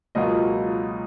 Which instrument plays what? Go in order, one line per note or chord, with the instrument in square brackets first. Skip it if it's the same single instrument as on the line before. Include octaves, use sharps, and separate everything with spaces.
[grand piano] C#2 B2 F#3 A#3 F4 D#5